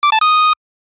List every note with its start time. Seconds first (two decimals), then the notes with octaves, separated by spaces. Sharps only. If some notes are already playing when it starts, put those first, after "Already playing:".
0.03 D6
0.12 A5
0.21 D#6